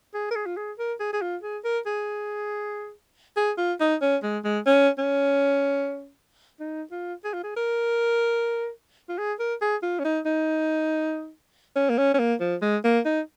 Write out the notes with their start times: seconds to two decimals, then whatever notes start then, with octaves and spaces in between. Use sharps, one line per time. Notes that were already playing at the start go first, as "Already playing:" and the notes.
0.14 G#4
0.31 A#4
0.35 G#4
0.46 F4
0.57 G#4
0.79 A#4
1.00 G#4
1.13 G#4
1.22 F4
1.43 G#4
1.64 A#4
1.86 G#4
3.37 G#4
3.58 F4
3.80 D#4
4.02 C#4
4.23 G#3
4.44 G#3
4.66 C#4
4.98 C#4
6.60 D#4
6.91 F4
7.24 G#4
7.33 F4
7.44 G#4
7.57 A#4
9.09 F4
9.18 G#4
9.40 A#4
9.61 G#4
9.82 F4
9.99 C#4
10.05 D#4
10.26 D#4
11.76 C#4
11.89 A#3
11.98 C#4
12.14 C#4
12.19 A#3
12.41 F3
12.62 G#3
12.84 A#3
13.05 D#4